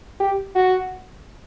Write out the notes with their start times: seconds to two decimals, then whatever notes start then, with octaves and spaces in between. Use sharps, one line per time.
0.20 G4
0.55 F#4